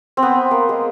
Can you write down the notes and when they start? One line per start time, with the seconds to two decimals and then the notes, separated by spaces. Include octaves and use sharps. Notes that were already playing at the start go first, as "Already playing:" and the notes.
0.17 C4
0.23 B3
0.51 A#3
0.69 G#3